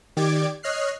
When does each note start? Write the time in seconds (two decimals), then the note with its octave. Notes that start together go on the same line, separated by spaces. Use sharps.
0.17 D#3 G4 D5 D6 G#6 D7
0.63 C#5 D#5 F6 F#6 C7